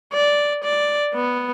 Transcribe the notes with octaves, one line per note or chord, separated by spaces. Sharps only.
D5
D5
B3